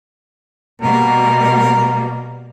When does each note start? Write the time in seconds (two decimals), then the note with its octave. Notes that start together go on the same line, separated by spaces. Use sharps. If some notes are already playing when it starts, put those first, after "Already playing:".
0.82 B2 G3 A#3 A#4